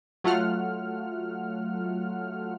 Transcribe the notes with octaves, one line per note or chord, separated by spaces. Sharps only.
F#3 A3 F4 F#5 F6